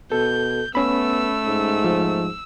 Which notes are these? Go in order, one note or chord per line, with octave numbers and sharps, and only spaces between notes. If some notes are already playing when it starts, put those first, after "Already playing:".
B2 A4 G6
A3 B3 C#4 B5 E6
G#2
F3